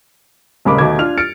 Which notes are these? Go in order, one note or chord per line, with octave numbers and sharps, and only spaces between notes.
D#1 C#3 G#3 A#3 B5 D6
D#2 B2 A3 D#5 D6 G#6
D4 F4 F6 F7
F6 A6 C#7 D7